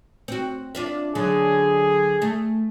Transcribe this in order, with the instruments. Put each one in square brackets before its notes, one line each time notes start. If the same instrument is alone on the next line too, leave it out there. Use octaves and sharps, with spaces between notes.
[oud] C4 F#4
D4 F4 E5
[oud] D3 F#3 [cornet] G#4
[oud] A3